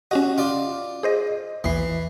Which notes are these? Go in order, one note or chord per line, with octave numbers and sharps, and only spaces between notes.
C#4 F#4 G4 D#5
F4 D5
G#4 C5 D#5
A#1 E2 E3 C7